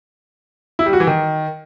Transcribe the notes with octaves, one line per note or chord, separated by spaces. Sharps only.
E4
G3
F#4
E3
D#3